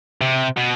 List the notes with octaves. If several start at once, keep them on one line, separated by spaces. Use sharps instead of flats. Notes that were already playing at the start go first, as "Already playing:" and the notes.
C3
B2